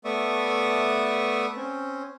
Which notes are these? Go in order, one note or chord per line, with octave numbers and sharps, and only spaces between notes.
A3 B3 D5 E5 C#6 D#6
C4 C#4